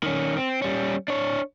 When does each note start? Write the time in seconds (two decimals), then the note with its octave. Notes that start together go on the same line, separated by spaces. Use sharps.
0.03 D#3 C#4
0.37 C4
0.62 G3 C#4
1.08 D4 C#5